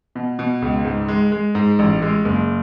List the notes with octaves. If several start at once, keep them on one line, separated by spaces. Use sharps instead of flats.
B2
B2
C#2
G#2
G#3
G#3
G#2
A1
G#3
F#1